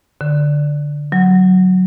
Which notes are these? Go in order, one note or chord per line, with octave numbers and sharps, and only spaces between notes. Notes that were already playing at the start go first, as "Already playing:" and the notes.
D3
F#3